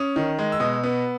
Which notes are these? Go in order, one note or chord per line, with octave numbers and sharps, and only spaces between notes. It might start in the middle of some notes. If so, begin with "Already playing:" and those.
Already playing: C#4 D#6
D#3
G#3
E6
B2 D#6
B3